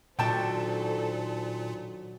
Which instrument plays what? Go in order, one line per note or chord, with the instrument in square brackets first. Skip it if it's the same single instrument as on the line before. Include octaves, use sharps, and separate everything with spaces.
[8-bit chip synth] A#2 [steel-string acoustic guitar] D#3 F#3 D4 [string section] A4 C5 [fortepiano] G5 A5